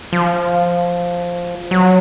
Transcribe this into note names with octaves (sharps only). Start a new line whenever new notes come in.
F3
F#3